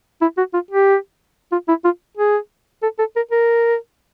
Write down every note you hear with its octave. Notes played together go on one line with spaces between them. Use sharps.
E4
F#4
F4
G4
F4
E4
F4
G#4
A4
A4
A#4
A#4